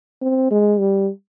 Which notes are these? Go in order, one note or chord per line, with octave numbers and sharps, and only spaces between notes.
C4
G#3
G3